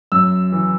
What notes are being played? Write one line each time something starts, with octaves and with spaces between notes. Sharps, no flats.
F#2 E6
E3